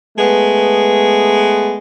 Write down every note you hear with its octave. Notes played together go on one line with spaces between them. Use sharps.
G#3 A3 B3